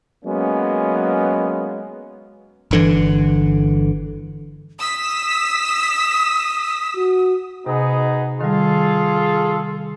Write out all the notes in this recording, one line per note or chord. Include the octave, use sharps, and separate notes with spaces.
F#3 G#3 A#3 B3 C#4
G1 D3 E3
D#6 E6 B6
F#4
C3 B3 D#4 G#4
D#3 G3 F4 G#4 A4